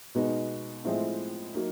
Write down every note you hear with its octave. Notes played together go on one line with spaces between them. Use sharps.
B2 G#3 B3 D#4
A2 F3 G#3 C4 E4
F#3 A#3 D#4